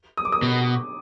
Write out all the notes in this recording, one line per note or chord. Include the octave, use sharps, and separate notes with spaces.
D#6
D6
D#6
B2